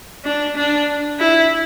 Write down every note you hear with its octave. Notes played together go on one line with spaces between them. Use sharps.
D4
D4
E4